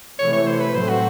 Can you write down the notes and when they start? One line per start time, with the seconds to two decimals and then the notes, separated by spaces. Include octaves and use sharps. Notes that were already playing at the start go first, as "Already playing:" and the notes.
0.19 C3 E3 A3 C#5
0.33 C#5
0.47 C5
0.61 B4
0.74 A2 F#3 A3 C4 C5
0.89 F#4